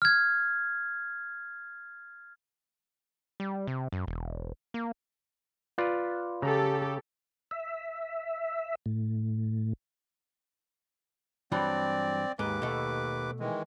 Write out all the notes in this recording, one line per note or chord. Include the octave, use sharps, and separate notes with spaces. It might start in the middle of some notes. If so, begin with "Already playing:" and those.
F6 G#6
G3
C3
F#2
E1
A#3
F4 B4 D5
C#3 G4 A4 A#5
E5
A2
G2 E3 F#3 C4 D5
D#2 G#2 B4 D6
B2 A3
D#3 E3 G#3